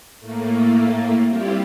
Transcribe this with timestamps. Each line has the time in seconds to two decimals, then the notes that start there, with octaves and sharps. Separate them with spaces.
0.20 A2 A3 A#3
1.28 G3 C4 E4 F4 G4